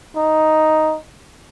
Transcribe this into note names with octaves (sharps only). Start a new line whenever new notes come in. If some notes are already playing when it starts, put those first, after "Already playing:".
D#4